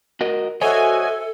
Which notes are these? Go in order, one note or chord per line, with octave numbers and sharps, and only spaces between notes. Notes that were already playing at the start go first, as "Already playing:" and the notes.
F#4 A#4 D#5
F#4 A4 C5 C#5 D#5 E5 G#5